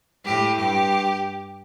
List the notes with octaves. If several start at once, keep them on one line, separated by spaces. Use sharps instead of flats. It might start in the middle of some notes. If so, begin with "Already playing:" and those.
A2 G4
G2 G4